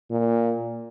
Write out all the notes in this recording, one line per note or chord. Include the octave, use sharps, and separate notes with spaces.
A#2